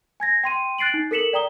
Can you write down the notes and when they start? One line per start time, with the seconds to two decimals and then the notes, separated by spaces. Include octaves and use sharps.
0.20 G#5 G#6 A#6
0.44 G5 C6 D#7
0.78 F#6 A6 C7 D7 F#7
0.94 D#4
1.11 A4 A#4 B6 C#7 E7 F#7
1.33 D5 G5 A#5 D#6 G7